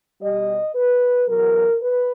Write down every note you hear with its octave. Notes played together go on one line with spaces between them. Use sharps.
B2 G3 D#5
B4
E2 B2 F#3 A#4
B4